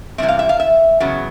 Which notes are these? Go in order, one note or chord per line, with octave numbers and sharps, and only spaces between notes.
C3 E3 G3 C4 E5
F5
E5
F5
E5
E2 C#3 F#3 B3